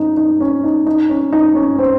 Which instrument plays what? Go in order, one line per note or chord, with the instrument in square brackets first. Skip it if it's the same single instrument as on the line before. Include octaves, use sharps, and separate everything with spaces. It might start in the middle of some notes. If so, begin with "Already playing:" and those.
Already playing: [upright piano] C#4 D#4
D#4
C#4
D#4
D#4
C#4
D#4
C#4
C4